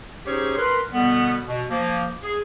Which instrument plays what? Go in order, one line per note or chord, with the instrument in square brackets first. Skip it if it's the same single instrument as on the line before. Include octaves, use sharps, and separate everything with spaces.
[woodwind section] C#4 D#4 G4 G#4 C5 C#5
A#4 B4 C6
B2 D3 G3 B3
B2
F3 A#3
G#4